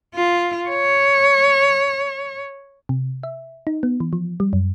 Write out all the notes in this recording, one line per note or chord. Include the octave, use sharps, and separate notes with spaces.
F4
C#5
C3
E5
D#4
B3
E3
F3
G3
F#2